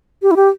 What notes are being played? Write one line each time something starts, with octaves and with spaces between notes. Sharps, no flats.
G4
E4
G4